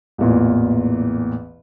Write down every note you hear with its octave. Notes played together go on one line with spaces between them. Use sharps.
A1 E2 A#2